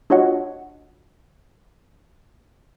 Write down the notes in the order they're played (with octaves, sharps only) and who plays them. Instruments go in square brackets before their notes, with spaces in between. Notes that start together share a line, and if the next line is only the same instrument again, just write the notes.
[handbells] D4 F4 F#4 C#5 D#5 F#5